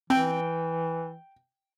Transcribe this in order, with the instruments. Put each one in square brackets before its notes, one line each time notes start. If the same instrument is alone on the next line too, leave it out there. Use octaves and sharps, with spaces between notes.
[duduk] E3 [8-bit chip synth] C4 [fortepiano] G5